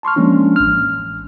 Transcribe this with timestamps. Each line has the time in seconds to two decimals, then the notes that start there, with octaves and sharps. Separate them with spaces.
0.03 A5 C6 C#6 F6
0.16 F3 G#3 A#3 C#4 D4
0.56 A1 F6